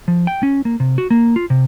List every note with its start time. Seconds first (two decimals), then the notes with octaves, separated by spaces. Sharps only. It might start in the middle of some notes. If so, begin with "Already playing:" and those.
0.08 F3
0.27 G5
0.43 C#4
0.65 A#3
0.80 C3
0.98 F#4
1.10 A#3
1.36 F4
1.50 C3